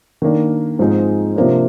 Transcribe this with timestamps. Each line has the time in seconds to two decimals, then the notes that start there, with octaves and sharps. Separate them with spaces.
0.22 D#3 A#3 D4
0.79 G#2 F3 G#3 C4 D#4
1.36 C3 F3 A#3 D4